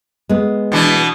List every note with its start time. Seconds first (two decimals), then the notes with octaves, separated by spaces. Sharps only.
0.29 G#3 B3
0.72 B2 E3 D4